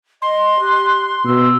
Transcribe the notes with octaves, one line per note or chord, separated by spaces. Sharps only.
D#5 C6
G4 F#6
B2 E6